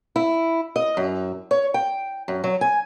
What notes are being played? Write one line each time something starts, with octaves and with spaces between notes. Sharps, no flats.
E4
D#5
F#2
C#5
G5
F#2
F#3
G#5